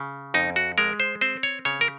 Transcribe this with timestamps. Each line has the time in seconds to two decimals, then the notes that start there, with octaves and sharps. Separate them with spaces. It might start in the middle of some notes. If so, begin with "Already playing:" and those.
Already playing: C#3
0.34 F2 D#4
0.56 F#4
0.78 G#3 A#4
1.00 C5
1.21 C4 C5
1.43 C#5
1.65 C#3 C#5
1.81 A#4